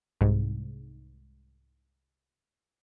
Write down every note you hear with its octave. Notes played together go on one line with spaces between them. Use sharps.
C2 G#2